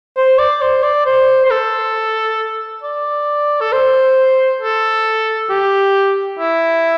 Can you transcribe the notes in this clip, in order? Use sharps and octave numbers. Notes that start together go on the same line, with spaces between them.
C5
D5
C5
D5
C5
C5
A4
D5
A4
C5
A4
G4
E4